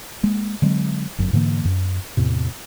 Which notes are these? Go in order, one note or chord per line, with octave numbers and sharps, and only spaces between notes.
G#3 A#3
D3 F#3 G#3 C4
G1 F#2
G#2 D3 E3 A#3
F#2
E2 A2 C3